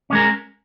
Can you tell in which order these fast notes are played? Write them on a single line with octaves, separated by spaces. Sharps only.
C#4 G#3 A#4